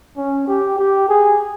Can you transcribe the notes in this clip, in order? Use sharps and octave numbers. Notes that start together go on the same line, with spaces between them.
C#4
G4
G4
G#4